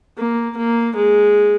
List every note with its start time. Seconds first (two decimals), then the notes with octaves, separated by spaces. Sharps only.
0.17 A#3
0.57 A#3
0.95 G#3